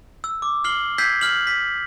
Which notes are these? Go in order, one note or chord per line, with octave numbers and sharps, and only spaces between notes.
E6
D6
F6 C7 F#7 G7
E6 G6 G#6 B6 C7
F6 F#7
B6